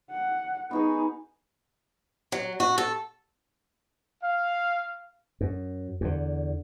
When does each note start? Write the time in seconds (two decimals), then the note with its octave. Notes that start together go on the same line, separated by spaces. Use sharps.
0.11 F#5
0.71 B3 D#4 F#4 G#4
2.32 F#3
2.60 F#4
2.78 A4
4.22 F5
5.41 F#2
6.01 E2 D3